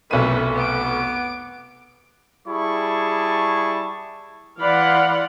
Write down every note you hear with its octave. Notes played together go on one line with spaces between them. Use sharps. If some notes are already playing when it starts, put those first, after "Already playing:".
F1 B1 F#2 D#3 A3 B4 D#7
B3 D6 D7
G3 E4 G#4 A5 C#6
E3 D5 F5 F#5 B5 C6